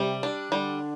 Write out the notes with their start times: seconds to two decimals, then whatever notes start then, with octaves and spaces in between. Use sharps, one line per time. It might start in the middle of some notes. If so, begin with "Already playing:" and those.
Already playing: C3 G3
0.23 D4
0.52 D3 G3